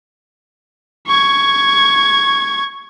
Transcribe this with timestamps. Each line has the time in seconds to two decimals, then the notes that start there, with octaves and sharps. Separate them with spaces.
1.07 C#6 G#6